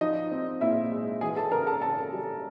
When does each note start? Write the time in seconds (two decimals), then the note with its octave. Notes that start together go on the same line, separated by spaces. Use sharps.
0.01 F3 D#4 D#5
0.32 C4
0.61 A#2 E4 E5
0.92 G#3
1.21 E3 G#4 G#5
1.36 A4 A5
1.51 C#3 A#4 A#5
1.67 A4 A5
1.81 C#3 A4 A5
2.13 G3